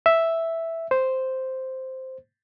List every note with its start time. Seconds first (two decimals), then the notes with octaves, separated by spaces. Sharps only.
0.06 E5
0.91 C5